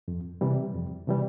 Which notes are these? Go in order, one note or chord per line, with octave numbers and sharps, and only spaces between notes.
F2
C3 E3 G3
F2
C3 E3 G3